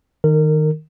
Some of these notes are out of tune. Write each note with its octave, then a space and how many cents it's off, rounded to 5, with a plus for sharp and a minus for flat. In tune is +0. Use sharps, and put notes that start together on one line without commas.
D#3 +0 A#4 -25